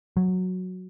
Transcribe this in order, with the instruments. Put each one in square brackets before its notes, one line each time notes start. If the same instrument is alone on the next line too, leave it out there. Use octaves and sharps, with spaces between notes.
[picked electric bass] F#3